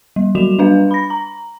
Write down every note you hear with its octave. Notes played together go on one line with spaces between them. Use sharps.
G3
F#3 G3 F#4 E7 F7
G3 D4 B4 F5
B5 A#6
A#5